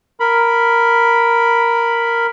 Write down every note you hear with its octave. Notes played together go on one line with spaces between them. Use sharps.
A#4 B5